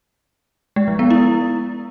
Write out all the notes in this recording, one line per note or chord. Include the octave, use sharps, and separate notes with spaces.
G#3
F3
B3
E4